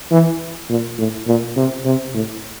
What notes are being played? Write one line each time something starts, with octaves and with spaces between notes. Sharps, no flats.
E3
A#2
A2
A#2
C3
C3
A2